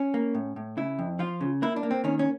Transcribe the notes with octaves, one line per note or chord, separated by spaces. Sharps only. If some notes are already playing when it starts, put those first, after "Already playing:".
Already playing: C#4
A#3
A2
A2
C#3 E4
F2
F3 F4
C#3
A#3 E4
D4
A#3
C4
D#3 C#4
C#4